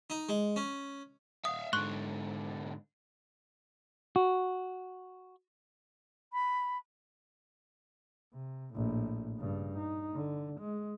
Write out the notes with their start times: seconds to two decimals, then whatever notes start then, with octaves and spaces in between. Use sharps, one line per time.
0.10 D#4
0.29 G#3
0.56 C#4
1.45 E5 F5 D#6
1.73 G#2 D3 C6 C#6 F#6
4.16 F#4
6.33 B5
8.33 C3
8.74 A#1 A2
9.37 G2 C#3
9.77 D#4
10.14 D3
10.60 G#3